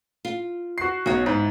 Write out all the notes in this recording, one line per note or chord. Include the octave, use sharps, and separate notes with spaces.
F4
F#4 C7
B1 F#4 C#5
G#2 E4